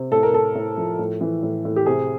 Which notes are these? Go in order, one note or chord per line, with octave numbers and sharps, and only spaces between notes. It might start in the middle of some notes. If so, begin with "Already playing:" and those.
Already playing: C3
A2 A4
A#4
A2 A4
A2
F3
A2
E3
A2
A2
G4
C3 G#4